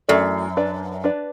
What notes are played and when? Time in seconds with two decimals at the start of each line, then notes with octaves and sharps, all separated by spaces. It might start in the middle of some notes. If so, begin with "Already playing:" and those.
0.08 F#2 E3 A3 F#4 A4 D5
0.57 D4 B4 D5
1.04 D4 B4 D5